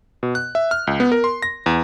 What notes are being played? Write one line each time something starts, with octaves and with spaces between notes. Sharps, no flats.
B2
F#6
E5
F6
C#2
B3
A#4
C6
A#6
E2